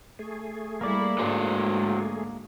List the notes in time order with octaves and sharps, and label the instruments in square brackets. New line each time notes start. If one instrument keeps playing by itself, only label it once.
[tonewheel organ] A3 G#4
[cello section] G3 E4 [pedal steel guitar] A#3 D5
[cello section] G#2 D3 [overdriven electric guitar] F#3 C5